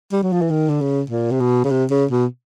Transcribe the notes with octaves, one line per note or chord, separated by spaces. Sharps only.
G3
F#3
F3
E3
D#3
D3
C#3
A#2
C3
B2
C#3
C3
C#3
B2